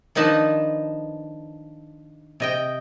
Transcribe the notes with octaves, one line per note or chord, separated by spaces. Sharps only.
D#3 F3 D4 D#4 B4 A5
C3 D#5 G5